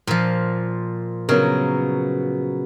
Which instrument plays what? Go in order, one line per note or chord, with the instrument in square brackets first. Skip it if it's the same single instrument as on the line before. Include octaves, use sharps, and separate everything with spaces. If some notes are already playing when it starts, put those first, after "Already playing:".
[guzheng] A#2 F3
[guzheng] C#3 [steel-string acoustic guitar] F#3 B3 A#4